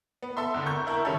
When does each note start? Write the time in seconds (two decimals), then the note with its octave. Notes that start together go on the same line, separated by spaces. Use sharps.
0.22 B3
0.37 A4 E5 C6
0.54 E2 D3
0.66 A#4 A#5 C#6 G6
0.87 E4 A#4 A5 C#6
1.05 D#3 G3 C#4 E4 A4